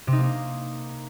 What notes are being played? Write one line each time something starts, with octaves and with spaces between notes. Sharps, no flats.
C3
D#4
A#3
D#4